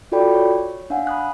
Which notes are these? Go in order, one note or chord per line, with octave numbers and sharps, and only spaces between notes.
F4 F#4 A4 D5 G5 B5
C#5
D4 F5 F#5 G#5
B5 D#6 F#6